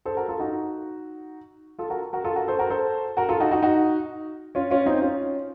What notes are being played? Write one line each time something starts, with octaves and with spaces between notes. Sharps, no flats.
A4 C5
F#4 A#4
F4 A4
D#4 F#4
F4 A4
F#4 A#4
F#4 A#4
F4 A4
F#4 A#4
A4 C5
F#4 A#4
A4 C5
F#4 A#4
F4 A4
D#4 F#4
D#4 F#4
D#4 F#4
C#4 F4
C#4 F4
C4 D#4
C#4 F4